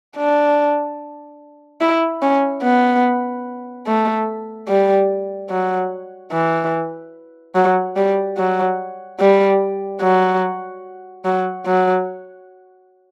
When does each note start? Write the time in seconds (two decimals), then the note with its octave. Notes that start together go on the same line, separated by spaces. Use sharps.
0.17 D4
1.81 E4
2.22 C#4
2.63 B3
3.87 A3
4.68 G3
5.50 F#3
6.32 E3
7.55 F#3
7.97 G3
8.38 F#3
9.20 G3
10.01 F#3
11.25 F#3
11.66 F#3